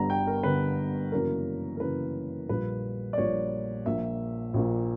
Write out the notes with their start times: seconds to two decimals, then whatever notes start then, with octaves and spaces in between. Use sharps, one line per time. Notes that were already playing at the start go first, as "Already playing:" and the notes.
Already playing: G1 G2 D3 G3 B3 A#5
0.10 G5
0.27 A#4
0.43 G1 G2 D3 G3 B3 B4
1.12 F#2 C#3 E3 A#3 A#4
1.77 A#4
1.80 F#2 C#3 E3 A#3 B4
2.49 A#1 A#2 G3 A#3 B4
3.13 D5
3.17 A#1 A#2 G3 A#3 C#5
3.86 A#1 A#2 A#3 E5
4.54 A#1 A#2 A#3